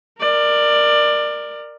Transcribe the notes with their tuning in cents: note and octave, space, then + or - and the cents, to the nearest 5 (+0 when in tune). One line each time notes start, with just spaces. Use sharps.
A#4 +0 D5 +20